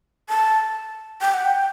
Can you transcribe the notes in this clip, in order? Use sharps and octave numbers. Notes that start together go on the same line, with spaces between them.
A5
G5
F#5
G5